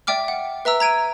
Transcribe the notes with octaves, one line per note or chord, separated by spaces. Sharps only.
D5 E5 G5 D6 F6
F#5
B4 E5 A#5 E6
A#5 G#6 D7 D#7